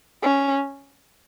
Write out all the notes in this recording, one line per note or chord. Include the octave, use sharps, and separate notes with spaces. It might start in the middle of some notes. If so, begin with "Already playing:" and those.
C#4